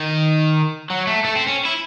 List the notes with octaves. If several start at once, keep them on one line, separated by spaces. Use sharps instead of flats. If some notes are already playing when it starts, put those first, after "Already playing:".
Already playing: D#3
F#3
A3
A3
C4
C#4
E4